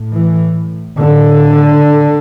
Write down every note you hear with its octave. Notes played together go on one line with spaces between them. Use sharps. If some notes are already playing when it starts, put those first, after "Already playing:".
Already playing: A2
E3
A2 D3